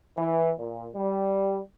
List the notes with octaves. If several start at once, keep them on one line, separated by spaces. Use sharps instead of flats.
E3
A#2
G3